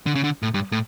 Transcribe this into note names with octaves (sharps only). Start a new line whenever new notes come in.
D3
C#3
D3
A2
G2
A2